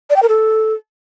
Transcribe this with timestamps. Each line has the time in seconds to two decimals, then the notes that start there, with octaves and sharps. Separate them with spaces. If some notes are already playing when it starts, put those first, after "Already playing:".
0.10 D5
0.16 G5
0.22 A#4
0.28 A4